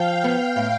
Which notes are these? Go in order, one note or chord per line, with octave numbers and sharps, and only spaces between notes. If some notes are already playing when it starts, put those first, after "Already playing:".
Already playing: F3 F5 G5
B3
A2